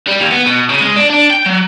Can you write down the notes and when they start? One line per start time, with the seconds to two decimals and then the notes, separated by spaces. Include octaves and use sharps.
0.07 G3
0.20 D#2
0.32 B3
0.47 B2
0.70 C#3
0.81 G#3
0.96 D4
1.10 D4
1.30 G5
1.46 F#3